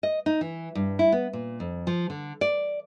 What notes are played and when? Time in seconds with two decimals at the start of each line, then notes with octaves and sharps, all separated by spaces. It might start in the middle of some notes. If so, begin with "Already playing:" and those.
0.03 D#5
0.26 D#4
0.41 E3
0.75 G2
0.99 E4
1.12 B3
1.33 A#2
1.60 F2
1.87 F3
2.10 D3
2.41 D5